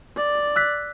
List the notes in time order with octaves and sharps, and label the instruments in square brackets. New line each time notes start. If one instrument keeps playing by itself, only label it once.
[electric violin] D5
[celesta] E6 F#6 B6